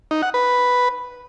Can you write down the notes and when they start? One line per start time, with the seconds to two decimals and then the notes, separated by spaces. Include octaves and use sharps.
0.11 D#4
0.22 F#5
0.34 B4